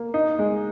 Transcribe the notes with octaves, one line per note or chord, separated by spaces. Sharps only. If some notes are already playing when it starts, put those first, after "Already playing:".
Already playing: A#3
D#4
G#3